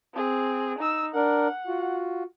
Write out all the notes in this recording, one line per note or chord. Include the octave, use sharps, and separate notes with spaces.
C4 G#4
D#4 E6
D4 A#4 F#5
F4 F#4